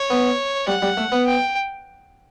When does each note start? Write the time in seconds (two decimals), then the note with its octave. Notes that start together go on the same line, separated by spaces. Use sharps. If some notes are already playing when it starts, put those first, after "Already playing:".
Already playing: C#5
0.10 B3
0.67 G3 F#5
0.82 G3
0.97 A3
1.12 B3
1.26 G5